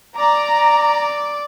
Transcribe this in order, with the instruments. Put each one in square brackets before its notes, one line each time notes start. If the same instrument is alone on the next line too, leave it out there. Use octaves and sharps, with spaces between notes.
[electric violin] D5 D6 [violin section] A#5